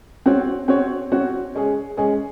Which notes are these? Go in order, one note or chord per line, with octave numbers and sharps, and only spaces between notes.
C4 F#4 C#5
C4 F#4 C#5
C4 F#4 C#5
G#3 C#4 G#4
G#3 C#4 G#4